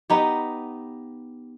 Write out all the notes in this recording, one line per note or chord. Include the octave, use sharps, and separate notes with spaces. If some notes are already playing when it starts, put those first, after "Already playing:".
B3 D#4 G4